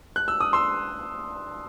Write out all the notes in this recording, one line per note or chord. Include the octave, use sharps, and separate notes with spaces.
F#6
E6
D#6
C6 E6